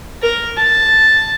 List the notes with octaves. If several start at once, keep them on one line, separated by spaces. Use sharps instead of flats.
A#4
A5